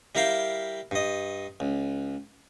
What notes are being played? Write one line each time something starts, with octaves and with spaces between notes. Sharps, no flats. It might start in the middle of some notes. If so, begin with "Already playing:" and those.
G3 E4 A#4 E5 F5 G5
G2 D#5
C#2